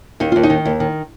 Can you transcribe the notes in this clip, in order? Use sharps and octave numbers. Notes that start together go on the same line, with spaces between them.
D#2 D#4
D#2 F4
D#4
D#3
D#2
D#3